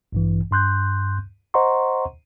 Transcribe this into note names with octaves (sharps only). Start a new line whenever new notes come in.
A1 G2 E3
G2 C6 F#6 G6
C5 D#5 F#5 A#5 C6 C#6